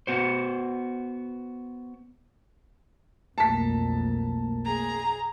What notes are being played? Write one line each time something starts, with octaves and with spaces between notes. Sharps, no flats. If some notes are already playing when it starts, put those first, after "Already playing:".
B3 F#4 C5
B1 F2 A3 A#3 A#4 A5 B6
G#4 A#5